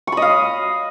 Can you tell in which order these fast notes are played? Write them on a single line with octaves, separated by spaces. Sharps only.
C#6 B5 D#5 F5